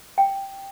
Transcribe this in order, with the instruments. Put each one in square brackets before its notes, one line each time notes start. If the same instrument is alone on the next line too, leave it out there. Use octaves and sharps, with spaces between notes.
[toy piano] G5